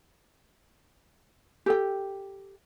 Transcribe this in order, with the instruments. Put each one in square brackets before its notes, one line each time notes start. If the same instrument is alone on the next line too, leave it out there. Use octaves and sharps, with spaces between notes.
[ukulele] G4 A4 G5